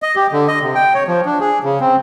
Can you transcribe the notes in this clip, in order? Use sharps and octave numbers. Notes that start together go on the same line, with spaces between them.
D#5
G4
D3
D#5
C3
G5
C#5
F3
D4
G#4
C#3
C4